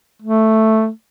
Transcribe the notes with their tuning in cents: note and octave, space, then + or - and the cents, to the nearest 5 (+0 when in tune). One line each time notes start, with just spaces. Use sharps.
A3 +0